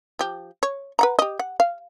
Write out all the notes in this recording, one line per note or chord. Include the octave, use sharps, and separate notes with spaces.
F3 G4
C#5
B4 F#5 A#5
G4 D#5
F#5
F5